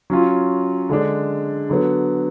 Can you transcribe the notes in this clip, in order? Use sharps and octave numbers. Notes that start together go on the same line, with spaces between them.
F#3 C#4 F4
D3 G#3 D4
D3 F#3 B3